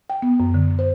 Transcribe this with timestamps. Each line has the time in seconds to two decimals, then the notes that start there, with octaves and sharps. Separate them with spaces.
0.10 G5
0.22 B3
0.40 F#2
0.54 D3
0.79 C5